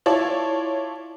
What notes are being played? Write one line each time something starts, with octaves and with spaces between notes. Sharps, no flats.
E4 F4 C#5 D5 A5